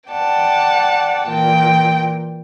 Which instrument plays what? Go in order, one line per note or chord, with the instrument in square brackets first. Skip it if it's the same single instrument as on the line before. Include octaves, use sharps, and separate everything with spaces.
[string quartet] D5 F#5 G5 A5
A#2 E3 G5